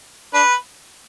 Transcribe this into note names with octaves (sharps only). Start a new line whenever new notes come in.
D4 B4